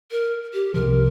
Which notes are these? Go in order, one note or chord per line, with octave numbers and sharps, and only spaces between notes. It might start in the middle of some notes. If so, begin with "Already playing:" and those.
A#4
G4
C2 C3 F3 A#4